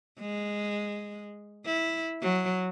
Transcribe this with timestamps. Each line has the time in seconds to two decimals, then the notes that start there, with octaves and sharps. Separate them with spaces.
0.20 G#3
1.65 E4
2.22 F#3